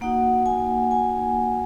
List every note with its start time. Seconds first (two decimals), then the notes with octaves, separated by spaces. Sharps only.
0.01 A#3 D#4 F#4 F#5
0.46 G#5
0.91 G#5